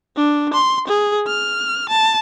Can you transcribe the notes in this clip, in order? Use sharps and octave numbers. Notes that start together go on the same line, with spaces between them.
D4
C6
G#4
F6
A5